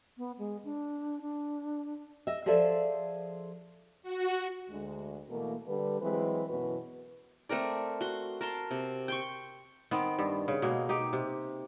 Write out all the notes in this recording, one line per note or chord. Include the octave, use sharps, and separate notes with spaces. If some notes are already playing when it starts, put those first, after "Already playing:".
B3
G#3
D4
D4
D#5 E5
F3 G#4 A4 C5 D5 E5
F#4
D2 G#3
B2 E3 A3 A#3
D3 G3 B4
E3 F#3 G#3 C4 B4
F#2 B2 E3 F#4 B4
A3 C4 A#4 D5
F#4 C6
A#4 A5 C6
C3
G5 C6 C#6
D#3 B3 C4
G2
C#3
B2 G#3 A#3
D#4 G4
C3